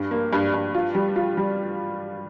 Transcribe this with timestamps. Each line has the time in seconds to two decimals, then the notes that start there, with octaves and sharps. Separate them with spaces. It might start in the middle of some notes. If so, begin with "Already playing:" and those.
Already playing: G2
0.11 A#3
0.33 G2
0.54 G2
0.74 F4
0.95 G3
1.16 F4
1.37 G3